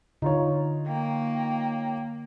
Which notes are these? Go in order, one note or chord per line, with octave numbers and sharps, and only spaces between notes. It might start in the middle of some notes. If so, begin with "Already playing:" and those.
D3 D#4 F4 C#5
A#3 G5